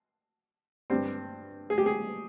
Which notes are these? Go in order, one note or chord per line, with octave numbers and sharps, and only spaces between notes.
G2 G3 C4
G#4
G4
G#4